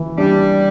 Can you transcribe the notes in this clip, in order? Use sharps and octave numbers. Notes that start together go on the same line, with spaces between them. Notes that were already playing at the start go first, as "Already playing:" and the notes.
Already playing: E3
G3 D4